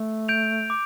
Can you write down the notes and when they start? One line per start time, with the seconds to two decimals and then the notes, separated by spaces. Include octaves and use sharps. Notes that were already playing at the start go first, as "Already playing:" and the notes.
Already playing: A3
0.28 G6 D7 F7
0.70 D6